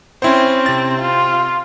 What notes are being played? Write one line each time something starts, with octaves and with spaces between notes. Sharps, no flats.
C4 C#4 E4 C5
C3 A6
F4